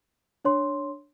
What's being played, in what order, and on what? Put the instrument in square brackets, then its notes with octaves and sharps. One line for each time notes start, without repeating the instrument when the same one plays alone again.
[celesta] D4 C#5 C6